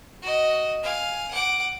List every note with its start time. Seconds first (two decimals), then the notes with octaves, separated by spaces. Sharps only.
0.22 F#4 D#5
0.83 F5 G#5
1.31 F#5 D6